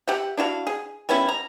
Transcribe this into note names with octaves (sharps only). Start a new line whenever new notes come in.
G4 E5 F#5
D4 E4 F#4 F5
G#4
G3 B3 C#4 E4
A#5